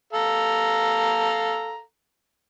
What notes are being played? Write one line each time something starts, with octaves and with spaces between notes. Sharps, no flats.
A4 F5 A#5